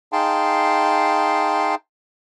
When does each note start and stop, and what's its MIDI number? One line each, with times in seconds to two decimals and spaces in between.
0.13 1.75 63
0.13 1.75 68
0.13 1.75 77
0.13 1.75 79
0.13 1.75 81
0.13 1.75 84